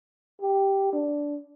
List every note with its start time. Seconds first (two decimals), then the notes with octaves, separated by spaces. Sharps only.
0.42 G4
0.93 D4